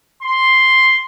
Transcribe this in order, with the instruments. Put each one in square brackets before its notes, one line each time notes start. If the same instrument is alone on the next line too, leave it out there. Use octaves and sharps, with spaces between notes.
[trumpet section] C6